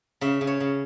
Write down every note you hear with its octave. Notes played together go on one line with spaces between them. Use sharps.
C#3 E5
C#3
C#5
C#3